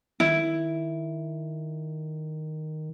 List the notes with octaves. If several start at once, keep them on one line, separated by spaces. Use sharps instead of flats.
D#3 E4